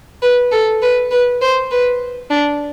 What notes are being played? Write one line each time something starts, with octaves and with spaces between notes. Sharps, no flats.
B4
A4
B4
B4
C5
B4
D4